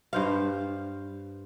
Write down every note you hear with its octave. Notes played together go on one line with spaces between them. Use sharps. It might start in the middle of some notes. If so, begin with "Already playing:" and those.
G2 C5 F5